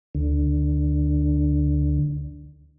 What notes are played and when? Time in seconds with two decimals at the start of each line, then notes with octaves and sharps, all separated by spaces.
0.15 D2 D3